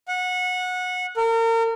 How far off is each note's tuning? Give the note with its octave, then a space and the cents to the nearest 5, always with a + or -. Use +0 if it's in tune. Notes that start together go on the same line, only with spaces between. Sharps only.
F#5 -20
A#4 -35